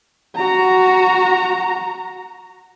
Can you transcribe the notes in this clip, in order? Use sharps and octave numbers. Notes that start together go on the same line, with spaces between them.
F#4 A#5